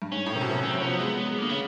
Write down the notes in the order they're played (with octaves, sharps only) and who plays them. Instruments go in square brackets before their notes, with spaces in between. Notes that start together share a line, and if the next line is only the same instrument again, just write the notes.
[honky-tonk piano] G2
[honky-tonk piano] G#2 [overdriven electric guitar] C#4
[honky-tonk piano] A2
C3
B2
C3
[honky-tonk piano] C3 [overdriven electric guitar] C#4
[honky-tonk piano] F#3 [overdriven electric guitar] C4
[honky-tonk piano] F3 [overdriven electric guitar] C#4
[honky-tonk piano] F#3 [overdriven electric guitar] B3
[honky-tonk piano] G#3
G#3
[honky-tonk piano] D3 [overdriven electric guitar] A#3
[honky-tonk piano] C#3 [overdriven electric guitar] B3